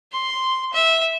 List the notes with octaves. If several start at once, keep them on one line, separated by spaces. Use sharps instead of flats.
C6
E5